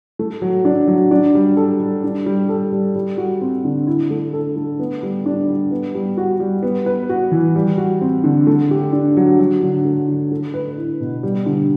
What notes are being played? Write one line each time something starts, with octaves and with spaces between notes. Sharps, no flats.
A3
F#3
D4
F#3
D4
G3
A4
G3
D4
G3
A4
G3
G3
F#4
C4
D3
E4
A3
A4
A3
B3
G3
D4
G3
B3
G3
F#4
G3
B3
B4
F#4
E3
G3
F#4
C4
D3
A3
G4
D4
F#3
F#3
D3
A3
D3
A3
B4
E4
B2
G3
D3